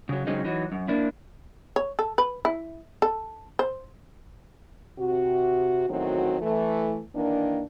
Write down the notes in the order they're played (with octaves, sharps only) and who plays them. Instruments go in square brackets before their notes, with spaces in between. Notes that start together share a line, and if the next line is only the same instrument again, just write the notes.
[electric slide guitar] C#3 F#3
C#3 F#3 G#3 C4 C#4 D#4
E3 F#3 D#4
F#2
A#3 D4 E4
[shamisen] C#5
A4
B4
E4
A4
C5
[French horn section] C3 F#4
E2 A2 D#3 F#3 C4 F#4
E3 A3
D#3 E3 A#3 D4